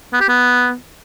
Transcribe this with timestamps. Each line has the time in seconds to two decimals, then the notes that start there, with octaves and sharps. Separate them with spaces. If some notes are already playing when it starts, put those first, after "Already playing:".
0.13 B3
0.21 G4
0.29 B3